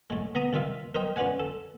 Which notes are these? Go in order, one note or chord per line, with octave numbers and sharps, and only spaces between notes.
A2 G#3
B3 A#5 D#6
C2 D#3 F4 E5 F5
A#4 C5 D#5 G5
C#4 F4 B4 D5 F#5 G#5
A4